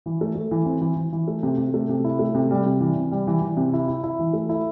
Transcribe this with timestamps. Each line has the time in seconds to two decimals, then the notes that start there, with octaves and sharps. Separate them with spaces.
0.06 E3
0.21 A3
0.35 A3
0.51 E3
0.66 C4
0.81 E3
0.96 E3
1.13 E3
1.28 A3
1.43 C3
1.58 C3
1.74 A3
1.89 C3
2.04 E4
2.19 A3
2.35 C3
2.51 G3
2.66 C3
2.80 E3
2.96 C3
3.11 G3
3.27 E3
3.42 E3
3.57 C3
3.73 E4
3.88 E4
4.04 E4
4.19 E3
4.33 A3
4.49 E4